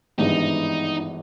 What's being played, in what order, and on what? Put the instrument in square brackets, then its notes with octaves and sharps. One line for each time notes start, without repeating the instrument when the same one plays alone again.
[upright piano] G#1 G2 E3 G#3 B3 [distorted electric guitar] D#4